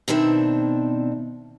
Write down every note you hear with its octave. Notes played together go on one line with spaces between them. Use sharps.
B2 D#3 C4 D4 E5